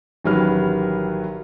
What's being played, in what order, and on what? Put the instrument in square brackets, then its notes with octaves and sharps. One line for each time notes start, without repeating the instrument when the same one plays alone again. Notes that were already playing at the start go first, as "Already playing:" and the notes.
[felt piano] A1 D#3 F#3 G3 B4 F6